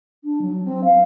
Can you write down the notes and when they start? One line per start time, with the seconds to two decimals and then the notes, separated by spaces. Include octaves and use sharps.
0.24 D4
0.41 F#3
0.64 C4
0.84 F5